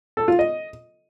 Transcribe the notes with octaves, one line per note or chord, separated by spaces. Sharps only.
A4
F4
D#5